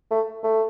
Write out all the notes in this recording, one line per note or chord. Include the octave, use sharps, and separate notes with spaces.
A3
A3